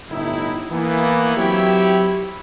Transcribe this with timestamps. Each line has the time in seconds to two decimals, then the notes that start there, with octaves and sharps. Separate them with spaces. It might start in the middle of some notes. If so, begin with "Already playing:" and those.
0.10 G1 A2 D#4 E4
0.71 E3 A#3 B3
1.36 F#3 C4 E4 G4 C#5 E5